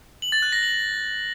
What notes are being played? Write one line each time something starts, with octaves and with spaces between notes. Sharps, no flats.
F#7
A6
F#6
A#6
F#7